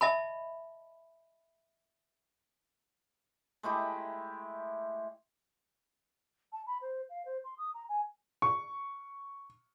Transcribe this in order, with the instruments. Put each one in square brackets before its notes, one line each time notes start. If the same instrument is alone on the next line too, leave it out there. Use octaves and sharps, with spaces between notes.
[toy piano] D#5 E5 A5 B5
[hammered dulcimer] G#3 A3 E4 G4
[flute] A5
B5
C5
F5
C5
C6
D#6
A#5
G#5
[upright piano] C#6